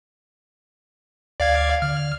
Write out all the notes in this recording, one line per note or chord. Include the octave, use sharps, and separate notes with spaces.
D2 D5 F5 G#6
D3 F6